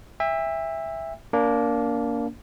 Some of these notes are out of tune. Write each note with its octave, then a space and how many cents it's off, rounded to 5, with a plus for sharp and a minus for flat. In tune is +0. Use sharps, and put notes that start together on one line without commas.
E5 +0 G5 +45
A#3 +5 D4 -30